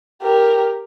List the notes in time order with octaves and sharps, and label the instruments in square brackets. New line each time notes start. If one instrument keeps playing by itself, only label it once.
[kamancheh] G4 A#4